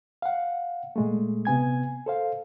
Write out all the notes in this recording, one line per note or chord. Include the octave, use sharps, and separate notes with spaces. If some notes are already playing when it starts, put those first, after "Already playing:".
F5 F#5
A#2 G#3 A3
C3 B3 G#5 G#6
A4 C5 F5